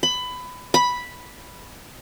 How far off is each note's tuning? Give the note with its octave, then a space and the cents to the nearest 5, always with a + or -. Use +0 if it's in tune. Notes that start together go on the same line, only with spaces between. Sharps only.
B5 +20
B5 -5